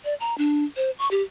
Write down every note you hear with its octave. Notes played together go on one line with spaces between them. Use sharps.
D5
A#5
D4
C5
C#6
G4